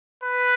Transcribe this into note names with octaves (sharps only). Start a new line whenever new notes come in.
B4